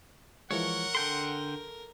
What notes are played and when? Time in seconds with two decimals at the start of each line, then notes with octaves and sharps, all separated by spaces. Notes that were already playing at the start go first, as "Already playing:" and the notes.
0.51 E3 F3 G#3 A#4 C#5 F#5
0.95 D3 A4 G5 C6